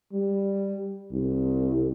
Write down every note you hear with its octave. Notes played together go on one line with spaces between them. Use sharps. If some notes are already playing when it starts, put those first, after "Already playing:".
G3
C2